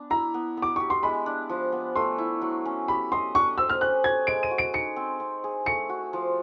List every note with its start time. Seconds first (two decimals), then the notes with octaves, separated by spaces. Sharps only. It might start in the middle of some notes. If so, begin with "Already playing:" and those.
Already playing: B3 D4
0.10 E4 A#5
0.34 B3
0.57 B3
0.62 D6
0.76 G4 C#6
0.90 C6
1.03 G#3 B5
1.26 D4
1.49 F3
1.72 B3
1.96 A3 C6
2.18 E4
2.42 F#3
2.65 C#4
2.88 G4 B5
3.12 D#5 C6
3.35 D4 C#6
3.58 C5 E6
3.70 F6
3.81 C#4 F#6
4.04 A4 G#6
4.27 G#3 D7
4.43 D#7
4.51 F#4
4.58 D7
4.73 D#4 C#7
4.96 C4
5.20 C4
5.44 G#4
5.66 A3 C#7
5.89 F#4
6.13 F3